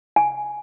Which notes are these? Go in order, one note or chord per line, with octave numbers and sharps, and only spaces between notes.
G#5